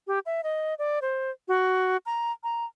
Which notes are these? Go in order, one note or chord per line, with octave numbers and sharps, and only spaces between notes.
G4
E5
D#5
D5
C5
F#4
A#5
A#5